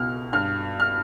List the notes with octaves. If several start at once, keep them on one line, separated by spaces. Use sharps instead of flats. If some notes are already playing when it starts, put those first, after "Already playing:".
Already playing: C#2 B2 F6
G2 F6
F6